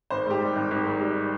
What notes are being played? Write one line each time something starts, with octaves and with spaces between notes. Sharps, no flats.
G#1 C5
G#2 G4
G3
G#1
G#1
G#2
G3